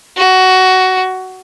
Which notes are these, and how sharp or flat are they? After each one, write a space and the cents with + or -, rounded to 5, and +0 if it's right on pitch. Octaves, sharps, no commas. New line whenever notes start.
F#4 +15